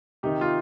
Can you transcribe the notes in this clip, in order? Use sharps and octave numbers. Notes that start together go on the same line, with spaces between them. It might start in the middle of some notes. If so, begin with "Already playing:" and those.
C3 D#3 D#4 G4
F4